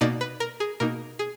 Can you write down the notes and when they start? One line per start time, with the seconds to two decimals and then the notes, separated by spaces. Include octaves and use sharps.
0.01 B2 A#3 D#4 D5
0.21 B4
0.40 A#4
0.60 G#4
0.80 B2 A#3 D#4 A#4
1.19 G#4